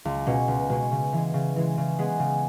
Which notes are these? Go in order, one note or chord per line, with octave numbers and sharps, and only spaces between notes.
C#2
B2 G#3 C#4
C#2
B2 G#3 C#4
C#3
E3 G#3
C#3
E3 G#3
C#3
G#3 B3 G#4
C#3